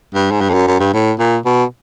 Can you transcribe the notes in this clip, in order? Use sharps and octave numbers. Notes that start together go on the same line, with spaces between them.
G2
G#2
G2
F2
F#2
F#2
G2
A2
A#2
B2